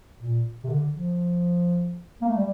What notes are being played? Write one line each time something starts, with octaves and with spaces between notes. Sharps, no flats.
A#2
C3
D3
F3
A#3
A3
G3